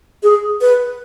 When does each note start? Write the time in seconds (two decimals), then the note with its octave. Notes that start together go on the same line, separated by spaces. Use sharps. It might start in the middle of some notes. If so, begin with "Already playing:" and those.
0.23 G#4
0.61 B4